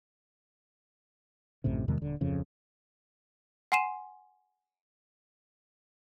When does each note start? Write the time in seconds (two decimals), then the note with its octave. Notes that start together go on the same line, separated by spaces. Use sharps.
1.64 A1 F#2 A2 C3
1.88 E2 C3 D#3 G#3
2.01 D#1 D3
2.21 D1 F2 C#3
3.72 F#5 G#5 C6 C7 D#7 E7